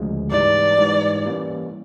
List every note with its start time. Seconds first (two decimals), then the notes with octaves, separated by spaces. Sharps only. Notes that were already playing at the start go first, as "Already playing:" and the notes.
Already playing: D2 C#3 F3 G#3
0.31 G#2 E3 G3 D5
0.77 G#2 E3 G3
1.24 E3 G3 A#3 C#4